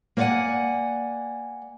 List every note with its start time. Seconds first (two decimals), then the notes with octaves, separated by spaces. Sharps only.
0.17 A#3 C5 D5 F5 F#5 G#5